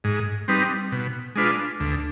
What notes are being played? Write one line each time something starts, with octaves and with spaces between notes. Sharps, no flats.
G#2
G3 C4 D#4 B4
B2
G#3 D4 F4 B4
D2